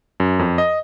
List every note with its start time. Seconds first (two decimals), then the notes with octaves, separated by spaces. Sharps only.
0.20 F#2
0.39 F2
0.58 D#5